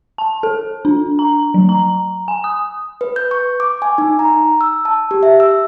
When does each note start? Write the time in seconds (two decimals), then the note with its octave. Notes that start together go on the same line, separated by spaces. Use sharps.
0.18 A5
0.43 A4
0.85 D4
1.19 A#5
1.54 F#3
1.69 A#5
2.28 G#5
2.44 D#6
3.01 B4
3.16 G6
3.31 C#6
3.60 D6
3.82 G#5
3.98 D#4
4.19 A#5
4.61 E6
4.85 A5
5.11 G4
5.23 E5
5.40 E6